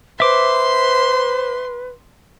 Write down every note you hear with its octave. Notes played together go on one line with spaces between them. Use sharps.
B4 C5 E5 C6 D6